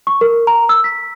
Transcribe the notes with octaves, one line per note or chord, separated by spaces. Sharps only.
C#6
A#4
A#5
E6
B6